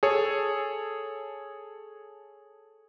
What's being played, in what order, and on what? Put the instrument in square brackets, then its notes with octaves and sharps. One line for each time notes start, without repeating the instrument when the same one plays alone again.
[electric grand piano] G#4 A4 C#5